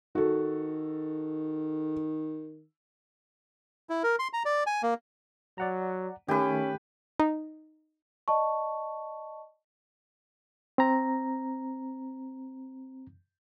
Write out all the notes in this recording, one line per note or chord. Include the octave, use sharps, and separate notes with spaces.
D#3 F#4 A4
E4
A#4
C6
A#5
D5
G#5
A#3
F#3 D5 F#5 A#5
D#3 A3 C#4 G4 B4 G#5
D#4
D5 D#5 A5 C#6
C4 A#5